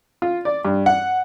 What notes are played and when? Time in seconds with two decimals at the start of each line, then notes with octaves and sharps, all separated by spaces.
0.22 F4
0.45 D5
0.65 G2
0.86 F#5